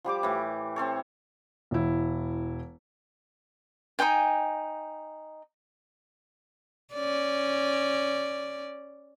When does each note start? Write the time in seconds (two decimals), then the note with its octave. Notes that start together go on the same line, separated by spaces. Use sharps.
0.04 F3 G3 G4 D6
0.23 A2 E3
0.76 C4 A4 C#5
1.71 E1 E4
3.99 D#4 F4 G5 G#5
6.93 C#4 D5